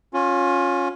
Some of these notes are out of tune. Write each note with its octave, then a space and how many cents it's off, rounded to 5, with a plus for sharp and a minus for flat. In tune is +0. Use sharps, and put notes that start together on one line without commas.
C#4 +0 F4 +25